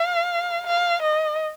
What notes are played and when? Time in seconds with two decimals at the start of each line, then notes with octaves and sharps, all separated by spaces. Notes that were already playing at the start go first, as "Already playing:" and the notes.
Already playing: F5
0.67 F5
1.02 D#5